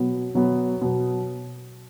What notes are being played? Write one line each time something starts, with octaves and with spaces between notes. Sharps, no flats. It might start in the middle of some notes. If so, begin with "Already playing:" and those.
Already playing: B2 F#3 B3
B2 F#3 B3
B2 F#3 B3